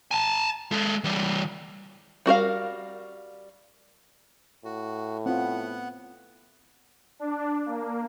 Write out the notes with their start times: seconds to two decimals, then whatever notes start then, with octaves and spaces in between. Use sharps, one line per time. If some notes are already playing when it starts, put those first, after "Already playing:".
0.11 G#5 A5
0.72 G#3 A4
1.04 E3 G3
2.26 G3 F#4 A#4 F5
4.65 A2 F#4
5.26 B3 C4 F4 F#5
7.19 D4
7.66 A#3